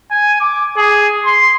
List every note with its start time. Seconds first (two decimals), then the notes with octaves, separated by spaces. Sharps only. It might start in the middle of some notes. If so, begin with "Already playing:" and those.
0.11 G#5
0.40 D6
0.77 G#4
1.25 C6